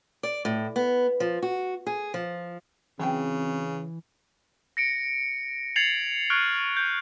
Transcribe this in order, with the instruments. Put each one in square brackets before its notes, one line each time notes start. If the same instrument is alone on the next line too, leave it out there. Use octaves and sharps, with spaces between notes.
[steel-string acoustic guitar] D5
A2
B3
F3
F#4
G#4
F3
[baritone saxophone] C#3 [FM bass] E3 [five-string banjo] F#3 G#4 G5 [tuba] C4
[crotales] A#6 C#7 D7
G#6 A6 C7 C#7 F7 F#7
C#6 F6 F#6 G#6 D7
G6